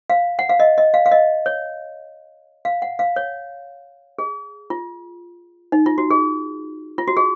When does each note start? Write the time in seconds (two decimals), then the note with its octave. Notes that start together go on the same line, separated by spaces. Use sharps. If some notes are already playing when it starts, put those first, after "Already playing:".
0.10 F5
0.39 F#5
0.49 F5
0.60 D#5
0.78 D#5
0.94 F5
1.06 F5
1.11 D#5
1.46 C#5
2.65 F5
2.82 F#5
2.99 F5
3.16 C#5
4.19 G#4
4.70 F4
5.72 D#4
5.86 F4
5.98 F#4
6.11 G#4
6.98 F4
7.08 F#4
7.17 G#4